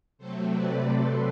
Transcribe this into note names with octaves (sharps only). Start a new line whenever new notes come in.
C3 F#3 A3 C4 A4 C5
B4 D5
A4 C5